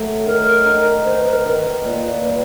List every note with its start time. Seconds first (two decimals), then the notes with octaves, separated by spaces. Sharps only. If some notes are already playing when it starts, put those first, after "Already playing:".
Already playing: F#3 A3
0.25 D#3 A#4
0.66 D#4
1.05 D#3 C5
1.19 B4
1.32 A#4
1.45 D#3 B4
1.85 A#2
2.25 G3